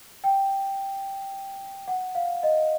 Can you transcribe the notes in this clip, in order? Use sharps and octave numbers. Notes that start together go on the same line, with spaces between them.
G5
F#5
F5
D#5